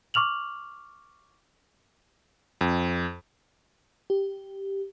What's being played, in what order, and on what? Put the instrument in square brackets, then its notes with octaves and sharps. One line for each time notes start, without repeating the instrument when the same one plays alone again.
[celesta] C#6 D6 F6 F7 F#7
[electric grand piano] F2
[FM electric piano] G4